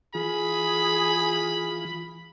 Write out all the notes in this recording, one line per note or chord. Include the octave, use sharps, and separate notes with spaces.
E3 F4 G#4 B5